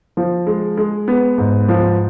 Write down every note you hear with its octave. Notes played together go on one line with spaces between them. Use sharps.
F3
G#3
G#3
B3
G#2
F3